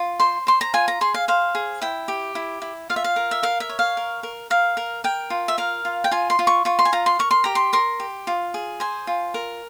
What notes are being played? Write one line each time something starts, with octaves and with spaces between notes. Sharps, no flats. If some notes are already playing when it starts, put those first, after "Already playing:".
Already playing: F4
C5 C6
C5 C6
A#5
F4 G#5
A#5
G#4 C6
F5
C5 F5
G#4
E4 G5
G4
E4
E4
F4 F5
E5
F5
A#4
E5
A#4 F5
E5
C#5
F5
A#4
A#4
A#4 F5
A#4
A#4 G5
F4
E5
A#4 F5
F4
G5
F4 G#5
C6
F4
C#6
F4 C#6
C6
G#5
F4 A#5
C6
A#4 C#6
C6
G4 A#5
C6
A#4 C6
G4
F4
G#4
C5 G#5
F4
A#4